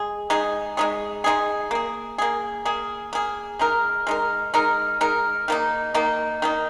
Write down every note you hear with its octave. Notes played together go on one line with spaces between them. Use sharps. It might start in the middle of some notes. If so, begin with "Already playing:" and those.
Already playing: G#3 G#4
G#3 D#4 G#4
G#3 D#4 G#4
G#3 D#4 G#4
A#3 G#4
A#3 G#4
A#3 G#4
A#3 G#4
G#3 D#4 A#4
G#3 D#4 A#4
G#3 D#4 A#4
G#3 D#4 A#4
D#3 A#3 D#4
D#3 A#3 D#4
D#3 A#3 D#4